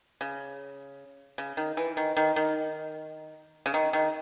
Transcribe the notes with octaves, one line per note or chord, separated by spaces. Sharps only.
C#3
C#3
D#3
E3
D#3
D#3
D#3
C#3
D#3
D#3